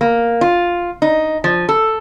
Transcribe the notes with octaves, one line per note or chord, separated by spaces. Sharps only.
A#3
F4
D#4
F3
A4